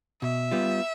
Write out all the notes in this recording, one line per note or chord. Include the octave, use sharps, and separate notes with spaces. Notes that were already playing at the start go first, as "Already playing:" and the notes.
B2 E5
G3 B3 F4